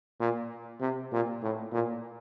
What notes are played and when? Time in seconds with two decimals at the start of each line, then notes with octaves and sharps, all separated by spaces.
0.20 A#2
0.81 C3
1.12 A#2
1.42 A2
1.72 A#2